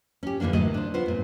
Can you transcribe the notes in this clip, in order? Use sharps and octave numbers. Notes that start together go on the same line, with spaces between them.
C#4 G4
D3 E3 F#3 A#3 D4
D2 A2 F#3 D5 D#5
D4 C5
B3 F4 C5
G2 A#2